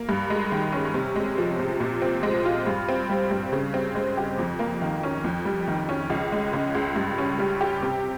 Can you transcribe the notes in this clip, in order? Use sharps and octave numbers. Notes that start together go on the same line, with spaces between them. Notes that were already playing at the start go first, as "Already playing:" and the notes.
Already playing: A#3
G2
G#3
D#3
C#4
C3
G#3
F3
C3
A#2
C4
G#3
F4
G2
C4
G3
G2
C#3
C4
G#3
G4
F2
A#3
D#3
C#4
F2
G3
D#3
C#4
C#2
G#3
C#3
C#2
G2
C#4
G3
G4
C3